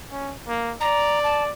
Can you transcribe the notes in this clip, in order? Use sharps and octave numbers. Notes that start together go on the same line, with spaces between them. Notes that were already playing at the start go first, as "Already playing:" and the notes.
C#4
A#3
D5 A#5
A5